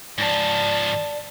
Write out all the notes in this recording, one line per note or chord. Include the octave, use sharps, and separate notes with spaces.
G#2 F3 D5 A5